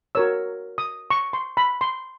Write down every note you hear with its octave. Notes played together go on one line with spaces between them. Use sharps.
F#4 A#4 C#5 E6
D#6
C#6
C6
B5
C6